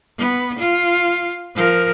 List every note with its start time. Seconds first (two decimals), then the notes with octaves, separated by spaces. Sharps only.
0.18 B3
0.58 F4
1.56 F3 A#4